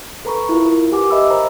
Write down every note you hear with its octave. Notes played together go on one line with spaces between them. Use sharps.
A4 B4 A#5 B5 C#6
E4 F4 A#4
A#4
G4 B4 F#5 G#5 D6
A#4 D#5 E5 B5 E6
C5 A#5